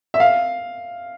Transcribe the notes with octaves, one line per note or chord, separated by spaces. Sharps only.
E5
F5